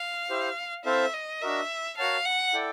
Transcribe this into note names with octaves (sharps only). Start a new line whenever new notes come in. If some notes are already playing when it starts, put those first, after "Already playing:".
Already playing: F5
E4 G4 C5
C4 E4 A4 C5 E5 F5
D#5
D4 F#4 A#4 D#5 E5
F#4 A#4 C#5 F5 F#5 A5
F#5
E4 A4 D5 G5